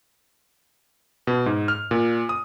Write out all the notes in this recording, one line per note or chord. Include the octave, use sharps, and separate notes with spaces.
B2
G#2
F6
A#2
D#6